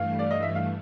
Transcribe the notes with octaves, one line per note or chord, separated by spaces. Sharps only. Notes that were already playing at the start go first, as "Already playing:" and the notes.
Already playing: G2 E3 A3 F5
D5
D#5
E5
F5